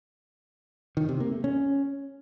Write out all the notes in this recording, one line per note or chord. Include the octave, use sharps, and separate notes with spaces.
D#3
C3
A#3
A3
C#4